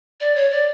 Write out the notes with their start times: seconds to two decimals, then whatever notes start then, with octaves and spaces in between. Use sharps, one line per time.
0.20 D5
0.35 C#5
0.51 D5